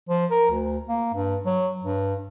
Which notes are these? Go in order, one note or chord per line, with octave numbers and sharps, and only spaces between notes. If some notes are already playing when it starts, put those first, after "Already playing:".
F3
A#4
D2
A#3
G2
F#3
G2